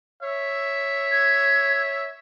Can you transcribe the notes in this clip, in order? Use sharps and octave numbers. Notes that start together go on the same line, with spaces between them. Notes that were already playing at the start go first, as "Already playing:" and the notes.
C#5 E5
G#6